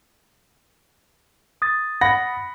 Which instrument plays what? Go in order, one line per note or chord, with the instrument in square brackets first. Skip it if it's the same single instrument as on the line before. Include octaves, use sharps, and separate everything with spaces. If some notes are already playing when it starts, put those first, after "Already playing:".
[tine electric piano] D#6 A6
[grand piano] F#5 B5 A#6